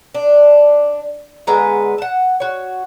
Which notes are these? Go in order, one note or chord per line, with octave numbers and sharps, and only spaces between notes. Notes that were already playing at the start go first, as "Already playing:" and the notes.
D4
D3 G#3 B3 A#5
F#5 A5
F#4 C#5